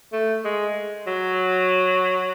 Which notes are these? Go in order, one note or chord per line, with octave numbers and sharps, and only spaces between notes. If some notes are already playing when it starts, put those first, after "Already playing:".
A3
G#3
F#3